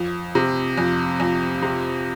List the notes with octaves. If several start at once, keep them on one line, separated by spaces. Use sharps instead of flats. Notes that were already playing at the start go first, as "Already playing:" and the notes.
Already playing: F2
C3
F2
F2
C3